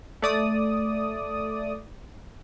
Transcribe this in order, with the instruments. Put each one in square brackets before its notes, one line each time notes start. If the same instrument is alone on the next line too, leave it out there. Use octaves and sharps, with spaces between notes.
[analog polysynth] A3 D5 D#6